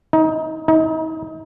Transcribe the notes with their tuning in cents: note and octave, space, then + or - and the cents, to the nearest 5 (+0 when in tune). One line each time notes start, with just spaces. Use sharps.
D#4 +25
D#4 +35